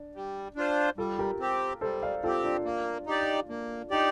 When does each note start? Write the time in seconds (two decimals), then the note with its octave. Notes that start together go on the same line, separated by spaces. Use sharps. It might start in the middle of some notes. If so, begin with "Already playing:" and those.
Already playing: D4
0.15 G3
0.56 D4 F4 C5
0.97 G3 F4 A4
1.19 G4 A#4
1.40 C4 G4
1.81 G3 A4 C5
2.03 D5 F5
2.24 C4 F4 G4 A4
2.44 D4 F4
2.65 A#3
3.07 D#4 G4 D5
3.49 A#3 D4
3.90 D4 D#4 G4 D5